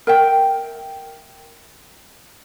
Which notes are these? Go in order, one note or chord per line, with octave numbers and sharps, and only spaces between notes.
A#4 E5 G5